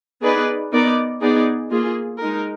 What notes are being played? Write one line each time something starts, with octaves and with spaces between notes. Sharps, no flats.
B3 D#4 G#4 B4 D5
B3 D#4 A#4 D5
B3 D#4 G#4 D5
A#3 F4 G#4
G#3 D#4 A#4